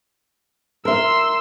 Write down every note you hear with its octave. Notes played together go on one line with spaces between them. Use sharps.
A#4 E5 C6 E6